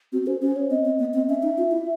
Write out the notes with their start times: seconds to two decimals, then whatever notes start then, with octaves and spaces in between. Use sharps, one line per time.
0.12 C4 F#4
0.27 C#4 C5
0.41 C#4 C5
0.56 C#5
0.70 C4 D#5
0.85 C4
0.99 B3
1.14 C4
1.28 C#4 E5
1.43 D#4
1.58 F4
1.71 E4